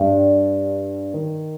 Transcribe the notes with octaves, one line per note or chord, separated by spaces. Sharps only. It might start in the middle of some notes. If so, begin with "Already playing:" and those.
Already playing: G2
D#3